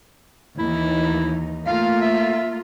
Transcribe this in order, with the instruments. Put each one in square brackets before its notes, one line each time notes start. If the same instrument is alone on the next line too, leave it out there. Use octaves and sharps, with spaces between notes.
[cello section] D#2 E3 D#4 [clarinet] E4
[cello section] A3 A#3 F4 [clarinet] F5
[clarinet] E5